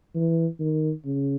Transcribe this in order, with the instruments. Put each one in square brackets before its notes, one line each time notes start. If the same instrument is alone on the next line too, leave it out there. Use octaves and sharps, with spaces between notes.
[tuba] E3
D#3
C#3